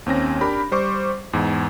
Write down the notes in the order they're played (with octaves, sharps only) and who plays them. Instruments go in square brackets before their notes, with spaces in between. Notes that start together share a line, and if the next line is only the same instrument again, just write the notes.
[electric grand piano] D#2 C4 C#4 A#6
D4 G4 A#4 B5
G3 C5 C#6 D6
E2 G#2